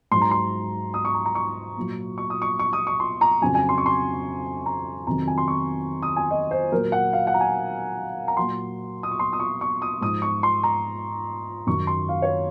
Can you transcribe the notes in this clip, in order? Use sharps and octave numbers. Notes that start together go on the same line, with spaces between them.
G#2 F#3 C6
A#5
C6
D#6
C#6
A#5
A#5
C#6
A#2 F#3
C#6
D#6
C#6
C#6
D#6
C#6
C6
A#5
F2 C#3 F#3 G#5
G#5
C6
C#6
C6
A#5
F2 C3 D#3 F#3 A#5
G#5
C6
C#6
D#6
G#5
D#5
C5
A#2 F#3 A#4
F#5
F5
F#5
A#5
G#5
A#5
A#2 F#3 C6
D#6
C#6
C6
D#6
C#6
C#6
D#6
G#2 F3 D#6
C#6
C6
A#5
F#2 D#3 F#3 C#6
C6
F5
C#5